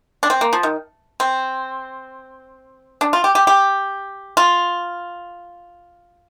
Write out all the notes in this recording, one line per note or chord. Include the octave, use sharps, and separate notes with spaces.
D4
C4
A#3
F3
D#3
C4
D4
F4
G4
G4
G4
F4